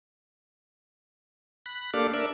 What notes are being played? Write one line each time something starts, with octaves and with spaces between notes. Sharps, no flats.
B5 F#6
A#3 D4 G4 A4 D5 F5
D4 A#4 D5 E5